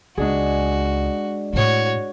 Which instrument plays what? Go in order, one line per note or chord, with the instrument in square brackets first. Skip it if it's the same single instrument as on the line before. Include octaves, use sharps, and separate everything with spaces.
[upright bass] C#2 [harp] G#3 D4 G#4 [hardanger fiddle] F#4
[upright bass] A2 E4 [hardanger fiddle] F#4 C#5